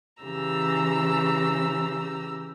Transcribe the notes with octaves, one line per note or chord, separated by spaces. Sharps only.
C#3 E3 G4 A#5 E6